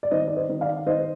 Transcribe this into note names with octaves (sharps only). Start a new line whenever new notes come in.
D5
D#3 C5 D#5
D5
C5 D#5
D#3
D5 F5
D#3 C5 D#5